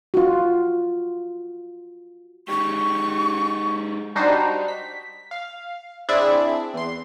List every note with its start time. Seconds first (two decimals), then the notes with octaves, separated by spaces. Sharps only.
0.14 F4 F#4
2.48 G#3 D#4 G4 C#6
4.16 G3 D4 D#4 F#4 C5
4.68 B6
5.31 F5
6.09 C4 D4 E4 G#4 D5 E5
6.74 E2 C6